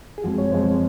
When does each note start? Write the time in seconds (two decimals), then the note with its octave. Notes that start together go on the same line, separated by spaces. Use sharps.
0.18 G#4
0.24 F#2 F3 G#3 C4 F#4
0.38 C#5
0.52 F#2 F3 G#3 C4 C5